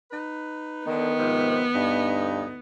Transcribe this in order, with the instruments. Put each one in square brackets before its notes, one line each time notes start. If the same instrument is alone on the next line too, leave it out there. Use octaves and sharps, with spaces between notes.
[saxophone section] D#4 B4
[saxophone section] D3 [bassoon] D#3 [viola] B3
[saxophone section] G#2 C3 F3
[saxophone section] D2 D#4 [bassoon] G2